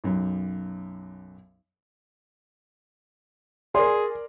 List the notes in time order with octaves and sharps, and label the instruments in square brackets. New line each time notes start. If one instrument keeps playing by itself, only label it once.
[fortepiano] B1 F#2
[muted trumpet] G#4 [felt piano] A#4 D5 [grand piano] C6